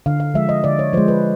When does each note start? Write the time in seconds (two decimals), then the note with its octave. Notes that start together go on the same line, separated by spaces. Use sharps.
0.06 D3 F5
0.20 F5
0.34 F3 G#3 E5
0.49 D#5
0.64 D3 D5
0.79 C#5
0.93 F3 G#3 C5
1.08 B4